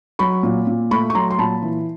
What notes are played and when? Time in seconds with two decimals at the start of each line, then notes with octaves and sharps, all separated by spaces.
0.19 F#3 B5 C#6
0.43 A#2
0.67 A#2
0.91 A3 B5 C#6
1.10 C#6
1.15 F#3 A#5 C6
1.31 C6
1.38 A#2 A5 B5
1.62 E3